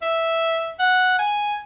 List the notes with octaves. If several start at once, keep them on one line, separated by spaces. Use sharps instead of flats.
E5
F#5
G#5